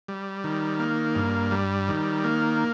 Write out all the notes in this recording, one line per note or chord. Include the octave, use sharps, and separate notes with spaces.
G3
D#3
A#3
G2
G3
D#3
A#3